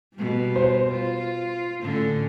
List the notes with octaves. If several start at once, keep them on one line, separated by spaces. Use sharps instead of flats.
B2 G3
C5
F4
A2 D3 C#4